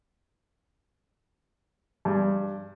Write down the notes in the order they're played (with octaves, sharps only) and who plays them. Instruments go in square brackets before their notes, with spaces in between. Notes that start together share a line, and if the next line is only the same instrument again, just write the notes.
[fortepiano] G2